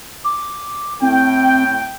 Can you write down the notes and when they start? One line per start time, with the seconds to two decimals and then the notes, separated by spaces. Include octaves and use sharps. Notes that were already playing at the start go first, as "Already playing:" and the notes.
0.24 D6
1.02 A2 C4 G5